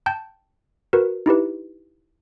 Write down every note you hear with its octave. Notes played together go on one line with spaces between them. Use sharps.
G5 A5 G6
F#4 A#4 B4
D#4 E4 G4 B4